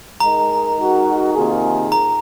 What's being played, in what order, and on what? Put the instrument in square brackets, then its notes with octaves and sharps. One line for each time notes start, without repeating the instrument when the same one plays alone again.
[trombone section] G#3 D#4 A#4 [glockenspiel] A#5
[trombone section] G#3 D#4 F#4 A#4
C3 D#3 A#3 F4 G#4
[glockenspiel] A#5